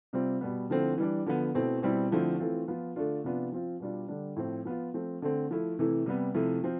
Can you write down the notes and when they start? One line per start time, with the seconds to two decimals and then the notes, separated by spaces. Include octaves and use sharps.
0.13 C3 G3 C4 F4
0.41 B2 G3 B3
0.70 D3 F3 A3 C4 E4
0.98 E3 G3 D4
1.26 D3 F3 B3
1.55 B2 A3 C4 E4
1.82 B2 G3 C4 E4
2.11 D3 F3 A3 C4 E4
2.39 E3 A3 C4 F4
2.68 F3 B3 F4
2.96 D3 A3 D4 F4
3.24 C3 F3 B3 D4 F4
3.52 F3 C4 F4
3.80 B2 G3 D4 F4
4.08 D3 G3 D4
4.36 A2 F3 A3 C4
4.65 F3 B3 F4
4.94 F3 A3 C4
5.22 D3 A3 C4
5.51 F3 A3 E4
5.79 C3 E3 A3 E4
6.06 C3 G3 B3
6.34 C3 F3 A3 E4
6.64 F3 C4